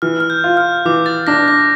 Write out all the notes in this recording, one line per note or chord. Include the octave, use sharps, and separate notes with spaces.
E3 F6
F6
G6
F4
F6
E3 D6
A6
D4 A#6
A#6